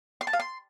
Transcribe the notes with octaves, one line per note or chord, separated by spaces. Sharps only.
C6
A5
F5
C6